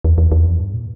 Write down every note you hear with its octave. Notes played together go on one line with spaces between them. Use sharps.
E2
E2
E2
F2
G2
A#2